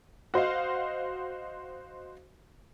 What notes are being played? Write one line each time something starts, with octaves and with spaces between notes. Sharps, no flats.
F#4 C5 D#5 F5